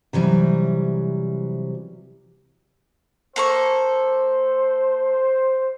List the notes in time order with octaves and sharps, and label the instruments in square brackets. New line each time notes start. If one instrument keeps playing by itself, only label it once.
[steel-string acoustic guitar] C3 E3 F#3 G3
[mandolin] A#3 A4 C#6 [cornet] C5